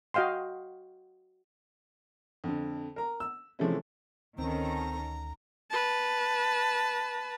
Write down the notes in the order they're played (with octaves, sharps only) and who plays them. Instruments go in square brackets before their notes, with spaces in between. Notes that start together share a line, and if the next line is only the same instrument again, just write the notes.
[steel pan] F#4 D#5 F5 G5 C6
[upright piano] F2 D3
A#4 A#5
E6
C3 E3 F3 G#3 A3 C#4
[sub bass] D2 [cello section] D#3 C#4 A4 [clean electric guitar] C4 [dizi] A#5
[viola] B4 A5